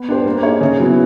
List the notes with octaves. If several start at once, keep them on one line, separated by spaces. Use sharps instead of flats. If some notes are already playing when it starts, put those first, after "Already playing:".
Already playing: B3
D4 G4 C5
A#3
D#4 G#4 C#5
C#3
F#3 B3 E4